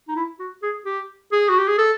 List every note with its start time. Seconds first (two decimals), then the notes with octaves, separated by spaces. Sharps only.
0.08 D#4
0.16 E4
0.39 F#4
0.63 G#4
0.86 G4
1.32 G#4
1.49 F#4
1.59 G4
1.68 G#4
1.78 A4